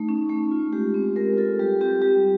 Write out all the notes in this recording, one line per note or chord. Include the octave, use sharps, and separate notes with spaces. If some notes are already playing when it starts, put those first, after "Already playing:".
Already playing: A3 D#4
C#4
A3
F4
G#3 G4
C4
G#3 A#4
F4 A4
G3 G4
C4 G4
G3 G4